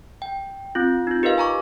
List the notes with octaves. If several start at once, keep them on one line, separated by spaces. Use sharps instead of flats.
G5
C4 F4
D#4 F4
G4 A#4 B4 D#5 F5
G#5 A#5 C#6 D6